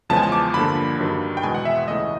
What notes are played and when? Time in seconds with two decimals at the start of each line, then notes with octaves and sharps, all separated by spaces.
0.09 E2 C#3 F3 G#3 B3 A5
0.16 G#5
0.23 A5
0.32 D6
0.54 G2 D3 F3 A#3 B5
0.99 G2 D#3 F#3
1.37 G5
1.43 E2 B2 G#3 B3 G#5
1.55 F#5
1.65 E5
1.88 C#2 C#3 E3 A3 D#5